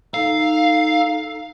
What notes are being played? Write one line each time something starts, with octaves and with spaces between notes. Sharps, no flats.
D#4 A4 F5